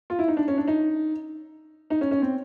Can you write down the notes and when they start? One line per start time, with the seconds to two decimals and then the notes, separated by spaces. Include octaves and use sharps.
0.10 F4
0.19 E4
0.28 D#4
0.37 D4
0.48 C#4
0.58 D4
0.68 D#4
1.90 D#4
2.01 C#4
2.11 C#4
2.22 C4